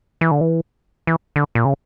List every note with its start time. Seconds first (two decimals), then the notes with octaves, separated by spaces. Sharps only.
0.21 E3
0.31 D3
0.41 E3
1.07 E3
1.36 D3
1.55 A#2
1.65 C#3